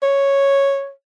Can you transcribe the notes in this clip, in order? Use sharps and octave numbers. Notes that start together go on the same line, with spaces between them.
C#5